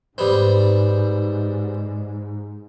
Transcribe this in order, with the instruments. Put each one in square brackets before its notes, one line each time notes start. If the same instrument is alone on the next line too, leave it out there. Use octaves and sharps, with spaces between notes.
[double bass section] G#2 [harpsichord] G3 B3 C4